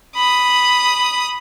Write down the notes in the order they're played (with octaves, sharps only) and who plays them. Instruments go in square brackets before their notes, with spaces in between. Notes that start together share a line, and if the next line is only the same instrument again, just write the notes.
[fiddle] B5 D#6